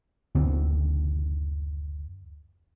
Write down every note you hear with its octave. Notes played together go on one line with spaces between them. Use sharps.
F#1 D2 D3 C4